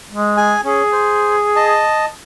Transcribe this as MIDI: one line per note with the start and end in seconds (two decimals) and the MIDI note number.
0.10 0.53 56
0.37 0.61 68
0.37 0.61 80
0.64 0.82 61
0.64 1.82 68
0.92 1.36 72
1.56 2.05 75
1.56 2.05 81